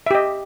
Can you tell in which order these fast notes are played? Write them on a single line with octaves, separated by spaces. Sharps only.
E5 G4 D#5